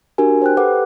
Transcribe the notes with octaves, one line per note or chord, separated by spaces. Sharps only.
D4 F#4 G4 A#4 G#5
C5 G5 F#6
G4 A4 B4 F#5 D6 F#6